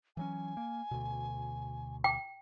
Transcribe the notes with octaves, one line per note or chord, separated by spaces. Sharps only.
E3 F#3 C#4 G#5
A#3
D2 B2
G5